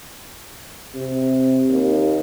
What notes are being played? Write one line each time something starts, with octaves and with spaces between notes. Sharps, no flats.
C3
D#2